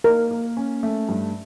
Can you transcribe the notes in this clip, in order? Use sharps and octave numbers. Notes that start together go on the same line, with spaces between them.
A#3 A#4
A#3
C#4
A3
G2